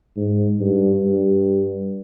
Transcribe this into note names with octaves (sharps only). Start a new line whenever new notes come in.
G#2
G2
G2